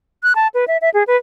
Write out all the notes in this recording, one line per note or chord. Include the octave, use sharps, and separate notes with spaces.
F#6
A5
B4
E5
E5
G#4
B4